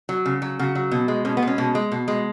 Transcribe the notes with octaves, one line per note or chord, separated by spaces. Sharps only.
F#3
C#3
F#3
C#3 F#4
F#3
B2
G#3
B2 C#4
B3
G#3
C#4
B2
G#3
B2
G#3